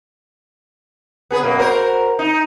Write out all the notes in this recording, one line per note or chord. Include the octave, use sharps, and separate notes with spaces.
B3 G#4 B4
F#2 B2 A#3
F#4 A#4 C5
D#4